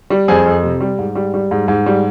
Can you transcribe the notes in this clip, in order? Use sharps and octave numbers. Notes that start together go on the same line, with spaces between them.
G3
F2 G#4 C5
F2
C3
G3
G#2
G3
G3
G#2
G#2
G3